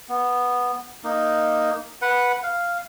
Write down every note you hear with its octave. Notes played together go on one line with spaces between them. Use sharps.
B3
A#3 D#4
B4 F#5
F5